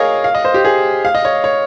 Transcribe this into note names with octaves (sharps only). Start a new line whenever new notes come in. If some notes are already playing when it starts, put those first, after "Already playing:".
Already playing: G#4 A#4 C#5 D#5 F5
F5
D#5
C5
G4
G#4
F5
D#5
C#5
C#5